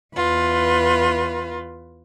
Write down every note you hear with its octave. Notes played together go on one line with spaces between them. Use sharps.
E2 F4 B4